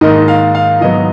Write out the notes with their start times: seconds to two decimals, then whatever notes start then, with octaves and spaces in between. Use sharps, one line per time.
0.01 G#2 D#3 A#3 D#4 D#5
0.28 F5
0.55 F5
0.81 G#2 D#3 F#3 B3 D#5